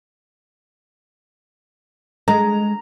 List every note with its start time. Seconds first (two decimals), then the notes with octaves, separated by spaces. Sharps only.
2.28 G#3 A#5